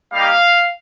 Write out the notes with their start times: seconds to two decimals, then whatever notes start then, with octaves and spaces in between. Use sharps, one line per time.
0.12 G3 A#3 D#4 G4 F5